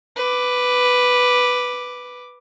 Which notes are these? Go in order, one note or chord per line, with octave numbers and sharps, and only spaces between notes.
B4 D6